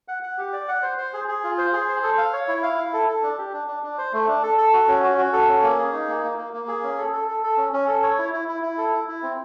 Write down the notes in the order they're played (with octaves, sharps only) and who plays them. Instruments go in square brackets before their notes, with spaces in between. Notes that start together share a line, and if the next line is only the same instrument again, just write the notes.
[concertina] F#5
F#5
G4
D5
F#5
C5
C5
G#4
G#4
F4
C5
G#4
C5
A4
F5
C#5
E4
F5
E4
A4
A4
D4
G4
D4
D4
D4
C5
A3
D4
A4
A4
F#4
C#4
F#4
F#4
A4
C#4
A#3
G#4
D#4
A#3
A#3
A#3
A#3
G#4
C#4
A4
A4
A4
A4
C#4
C#4
A4
C#5
E4
E4
E4
E4
A4
E4
E4
C4